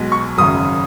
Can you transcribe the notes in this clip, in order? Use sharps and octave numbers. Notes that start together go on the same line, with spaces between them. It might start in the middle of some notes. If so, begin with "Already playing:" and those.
Already playing: B1 B2 G#3
C#6
G#1 F#2 C#3 D#6